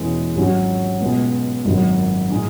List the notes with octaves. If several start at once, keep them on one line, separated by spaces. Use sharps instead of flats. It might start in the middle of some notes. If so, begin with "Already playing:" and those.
Already playing: E2 B2 G#3 C#4 E4
G#1 G#2 F#3 C#4 F#4
C#2 B2 G#3 B3
G#1 F#2 D#3 F#3
A2 G#3 D#4